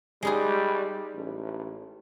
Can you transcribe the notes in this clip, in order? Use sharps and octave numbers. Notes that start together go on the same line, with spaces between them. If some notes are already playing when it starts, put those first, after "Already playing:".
G3 G#3 D#4 G#4
A1